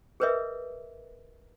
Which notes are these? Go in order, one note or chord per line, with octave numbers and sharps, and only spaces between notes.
G#4 A#4 B4 C#5 D#5 E5